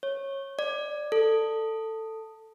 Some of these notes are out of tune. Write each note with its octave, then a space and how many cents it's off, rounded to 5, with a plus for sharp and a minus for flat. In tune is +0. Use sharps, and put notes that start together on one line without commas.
C#5 -20
D5 +20
A4 +15